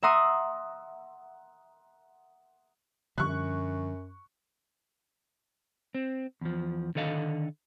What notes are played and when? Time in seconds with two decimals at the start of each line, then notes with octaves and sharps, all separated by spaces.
0.03 E5 F#5 A#5 C6 D#6
3.18 F#2 D3 F3 G3 C#6 F#6
5.95 C4
6.41 E2 F3
6.95 D3 D#3 A4 D#5 F5